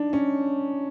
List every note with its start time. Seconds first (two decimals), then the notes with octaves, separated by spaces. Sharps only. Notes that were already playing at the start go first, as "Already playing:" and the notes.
Already playing: D4 D#4
0.13 C#4